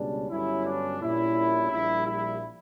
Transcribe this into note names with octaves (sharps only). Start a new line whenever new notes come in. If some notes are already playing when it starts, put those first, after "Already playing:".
Already playing: C#2 B2 G3 C#4 D4
G1 G2 F#3 C#4 E4
D4
A#1 A#2 G3 C#4 E4
A#1 A#2 G3 E4
E4